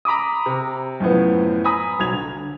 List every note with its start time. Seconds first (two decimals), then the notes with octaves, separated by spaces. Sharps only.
0.05 A#5 B5 D6 D#6
0.46 C3
1.00 F#2 A2 F3 B3
1.64 G#5 A#5 B5 D#6
1.99 B1 F#3 G#6 F7
2.12 D3